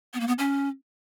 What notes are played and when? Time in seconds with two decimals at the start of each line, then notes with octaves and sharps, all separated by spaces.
0.14 B3
0.20 A#3
0.27 B3
0.38 C#4